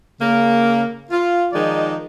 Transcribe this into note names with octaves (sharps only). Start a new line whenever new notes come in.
C#3 A#3
F4
D#3 F3 G#3 D#4 D5